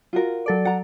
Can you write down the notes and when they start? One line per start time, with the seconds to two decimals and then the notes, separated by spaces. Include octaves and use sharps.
0.13 F4 F#4 A#4
0.46 F#3 A4 D5
0.65 F#5 A#5